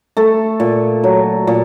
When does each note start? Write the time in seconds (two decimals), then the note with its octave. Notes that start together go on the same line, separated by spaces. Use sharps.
0.17 A3 A4
0.60 A#2
1.04 F#3
1.47 A#2